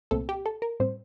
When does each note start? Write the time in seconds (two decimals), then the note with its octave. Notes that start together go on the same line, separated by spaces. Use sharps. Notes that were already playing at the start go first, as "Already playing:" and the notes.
0.11 C2 A#2 A3 C4 A4
0.29 G4
0.46 A4
0.62 A#4
0.80 A2 G3 C4 C5